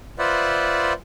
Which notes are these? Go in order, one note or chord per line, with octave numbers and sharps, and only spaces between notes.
F4 B4 C5 D5 E5 F#5